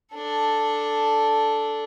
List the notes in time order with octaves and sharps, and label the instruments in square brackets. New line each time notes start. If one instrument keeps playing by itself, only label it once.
[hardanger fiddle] D4 A4